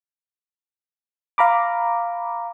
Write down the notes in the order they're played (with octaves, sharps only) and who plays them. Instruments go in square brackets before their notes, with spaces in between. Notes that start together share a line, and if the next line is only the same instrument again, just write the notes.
[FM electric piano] F5 A#5 B5 D6